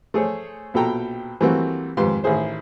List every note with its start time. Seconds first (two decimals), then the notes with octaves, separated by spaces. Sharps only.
0.14 A3 G#4 C5 C#5
0.74 A#1 B2 A4 G5 A#5
1.41 E3 G3 A3 A#3 C4 F#4
1.97 F2 G#2 D#3 G4 B4 C6
2.24 A1 D#3 G#4 C5